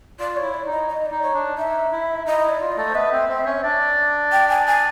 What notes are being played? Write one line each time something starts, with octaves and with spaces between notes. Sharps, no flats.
F4 D5
C#5
E4
D5
D#4 D#5
D#5
D5
D#4
C#5
D4
D#4 E5
E4
D#4 D#5
E4
D5
F4
D#5
A3 A4
C5
B3 B4 E5
C4 C5
C4 C5
C#4 C#5
D4 D5
G5
G#5
G#5